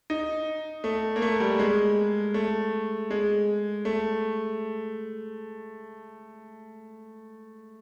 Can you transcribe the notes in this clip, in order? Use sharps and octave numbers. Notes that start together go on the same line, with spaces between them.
D#4
A3
A#3
A3
G3
G#3
A3
G#3
A3